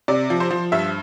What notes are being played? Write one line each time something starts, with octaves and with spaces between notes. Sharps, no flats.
C3 D5
F3
C5
F3
G2 E5